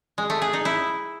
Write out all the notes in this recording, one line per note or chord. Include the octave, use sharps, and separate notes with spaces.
G#3
A3
G#4
D#4
E4